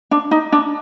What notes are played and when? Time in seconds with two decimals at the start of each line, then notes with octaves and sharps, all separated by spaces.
0.11 D4
0.31 D#4
0.52 D4